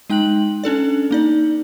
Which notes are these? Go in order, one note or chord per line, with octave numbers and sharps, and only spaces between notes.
G#3 D#4 G5 F#6 F#7
C#4 D4 A4 D5
A#3 D#4 D5